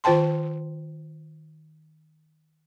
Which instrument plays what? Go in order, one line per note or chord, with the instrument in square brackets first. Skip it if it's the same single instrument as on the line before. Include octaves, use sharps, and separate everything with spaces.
[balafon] D#3 F4 C5 G5 A5 C6